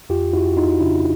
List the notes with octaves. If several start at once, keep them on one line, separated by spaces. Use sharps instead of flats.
F2 F4 G4
F2 E4 F#4
F2 D#4 F4
C#3 D4 E4